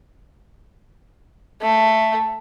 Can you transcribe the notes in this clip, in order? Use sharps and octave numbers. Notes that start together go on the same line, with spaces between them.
A3